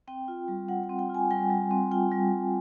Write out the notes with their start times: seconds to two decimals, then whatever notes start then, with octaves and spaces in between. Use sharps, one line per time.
0.08 C4 G5
0.28 F4
0.48 G3
0.68 G3 F#5
0.84 G5
0.89 C4
0.99 G5
1.09 F4
1.14 G#5
1.31 G3 G5
1.50 G3
1.71 C4
1.91 F4 G5
2.12 G3
2.32 G3